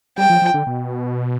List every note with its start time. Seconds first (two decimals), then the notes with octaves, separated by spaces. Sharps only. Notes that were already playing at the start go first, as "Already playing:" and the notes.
0.18 G3 G5
0.30 F3
0.42 F3
0.54 D3
0.67 B2